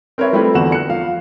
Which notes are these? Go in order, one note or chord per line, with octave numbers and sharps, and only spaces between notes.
C4 A#4 B4 C#5 E5
F3 G3 A3 C4 E4 B4
E2 D3 F#4 F#5 E7
F#6 C#7
F3 F5